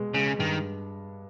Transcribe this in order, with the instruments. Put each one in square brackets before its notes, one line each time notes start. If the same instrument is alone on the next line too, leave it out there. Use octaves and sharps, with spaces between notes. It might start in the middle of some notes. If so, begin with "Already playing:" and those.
Already playing: [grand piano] B2 G#3
[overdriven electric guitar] C#3 [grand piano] G#3
[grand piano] G2 [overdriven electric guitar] D#3